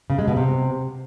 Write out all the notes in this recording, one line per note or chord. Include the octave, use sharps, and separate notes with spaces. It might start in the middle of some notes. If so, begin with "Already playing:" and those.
C#3
G#3
B2
C3